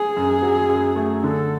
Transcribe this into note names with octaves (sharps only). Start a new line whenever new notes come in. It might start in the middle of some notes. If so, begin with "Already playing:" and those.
Already playing: G#4
F#2
F#3
F#2
A3
D3 A4